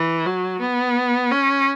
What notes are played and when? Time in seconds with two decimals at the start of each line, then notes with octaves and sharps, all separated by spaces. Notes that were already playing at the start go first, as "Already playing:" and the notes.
Already playing: E3
0.25 F#3
0.60 B3
1.31 C#4